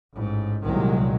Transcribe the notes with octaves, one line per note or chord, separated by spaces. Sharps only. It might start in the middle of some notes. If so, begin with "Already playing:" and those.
A1 G#2
C2 A#2 D#3 F#3 G#3